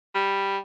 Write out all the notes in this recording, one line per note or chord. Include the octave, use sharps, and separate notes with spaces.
G3